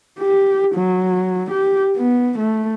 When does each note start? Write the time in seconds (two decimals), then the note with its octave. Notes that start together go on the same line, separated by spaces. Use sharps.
0.19 G4
0.75 F#3
1.50 G4
1.97 B3
2.38 A3